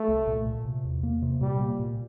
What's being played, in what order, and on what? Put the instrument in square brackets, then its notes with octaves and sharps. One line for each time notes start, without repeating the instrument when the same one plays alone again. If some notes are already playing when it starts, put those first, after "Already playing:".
Already playing: [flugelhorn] A3
[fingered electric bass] C2
A#2
A#2
C3
E2
A#3
C3
[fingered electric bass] A#2 [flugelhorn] G3
[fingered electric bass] A#3
A#2